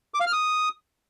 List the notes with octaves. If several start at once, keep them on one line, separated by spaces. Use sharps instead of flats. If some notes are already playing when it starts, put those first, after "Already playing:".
D6
F5
F6
D#6